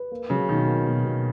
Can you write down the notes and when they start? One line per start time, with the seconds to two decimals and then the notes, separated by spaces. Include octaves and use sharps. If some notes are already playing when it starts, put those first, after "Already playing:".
Already playing: B4
0.12 A#3
0.30 C#3 F#3
0.49 B2 D#3
0.67 A#3
0.86 B2
1.05 B2